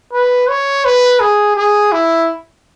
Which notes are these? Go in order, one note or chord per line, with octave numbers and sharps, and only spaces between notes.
B4
C#5
B4
G#4
G#4
E4